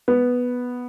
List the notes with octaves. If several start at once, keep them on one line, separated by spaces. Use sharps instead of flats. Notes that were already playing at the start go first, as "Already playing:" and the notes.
B3